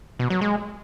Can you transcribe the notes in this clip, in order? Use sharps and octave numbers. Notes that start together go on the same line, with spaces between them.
B2
F#3
G#3